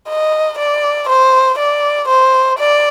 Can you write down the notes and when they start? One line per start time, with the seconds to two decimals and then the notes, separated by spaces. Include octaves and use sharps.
0.09 D#5
0.58 D5
1.09 C5
1.59 D5
2.08 C5
2.59 D5